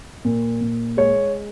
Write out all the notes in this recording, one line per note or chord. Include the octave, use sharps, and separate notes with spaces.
A#2
A#2
G#3 C#5